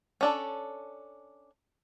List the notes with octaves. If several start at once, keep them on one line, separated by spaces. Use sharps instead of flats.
C#4 D4 A4